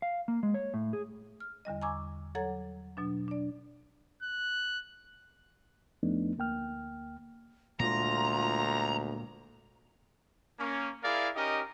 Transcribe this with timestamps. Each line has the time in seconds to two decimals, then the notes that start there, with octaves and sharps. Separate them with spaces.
0.02 F5
0.28 A#3
0.43 G#3
0.54 C#5
0.74 A2
0.93 G#4
1.40 F6
1.65 E2 D3 G3 D#5
1.81 G#5 A#5 C#6 D6 E6 G#6
2.35 F#3 A4 C#5 F#5 A#5 G#6
2.97 B2 F#3 D4
3.28 D4 D5
4.22 F#6
6.03 F2 F3 A3 B3 D4 D#4
6.38 D2 A#3 G5 F6
7.80 D2 A#2 G#3 F4 A#5
10.59 A#3 C#4
11.03 E4 G#4 A#4 D5 F5
11.36 C#4 D#4 G4 A#4 D#5